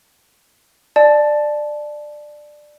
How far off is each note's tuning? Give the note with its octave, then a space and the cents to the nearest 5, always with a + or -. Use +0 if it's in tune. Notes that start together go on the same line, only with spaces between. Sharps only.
D5 +15 A5 -20